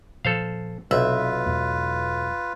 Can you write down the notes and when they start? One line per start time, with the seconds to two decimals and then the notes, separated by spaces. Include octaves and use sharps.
0.25 A#2 F3 A4 C5 F5
0.91 B1 C3 F4 B4 E5
1.46 E2 G#2 B2